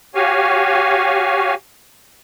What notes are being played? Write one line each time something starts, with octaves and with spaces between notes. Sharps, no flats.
F#4 G4 C#5 F5 G#5